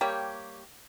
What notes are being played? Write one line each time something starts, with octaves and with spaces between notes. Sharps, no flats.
G3 A#3 G4 C#5